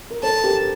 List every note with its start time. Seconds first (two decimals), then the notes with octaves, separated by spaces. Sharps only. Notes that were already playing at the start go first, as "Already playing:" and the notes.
0.11 A#4
0.23 A4 C5 A5
0.44 G4 A#4